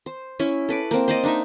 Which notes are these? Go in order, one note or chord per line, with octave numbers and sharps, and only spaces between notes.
C5
C#4 E4
A4 B4 D6
A#3 C4
C5 D5 D#5
D4 D#4 E5